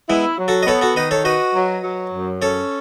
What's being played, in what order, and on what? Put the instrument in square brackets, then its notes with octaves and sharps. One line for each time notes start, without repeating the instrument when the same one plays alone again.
[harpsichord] G#3 B3 [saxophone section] E4
[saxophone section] F#3
[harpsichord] F#4 A4
D#5
[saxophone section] B3 [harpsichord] A4 C#5
[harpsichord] F#4 A4
[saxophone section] D#3 [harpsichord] B4 D#5
[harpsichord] A4 C#5
[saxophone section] F#4 [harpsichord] B4 D#5
[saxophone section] F#3
F#3
F#2
[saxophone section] C#4 [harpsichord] A4 C#5